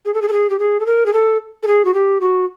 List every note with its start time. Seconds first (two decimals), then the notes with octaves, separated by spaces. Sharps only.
0.05 G#4
0.14 A4
0.22 G#4
0.28 A4
0.33 G#4
0.50 G4
0.59 G#4
0.80 A4
0.86 A#4
1.06 G#4
1.13 A4
1.63 A4
1.67 G#4
1.85 F#4
1.94 G4
2.21 F#4